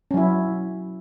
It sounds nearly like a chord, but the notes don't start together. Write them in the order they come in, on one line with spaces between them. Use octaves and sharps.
C#4 F#3 E4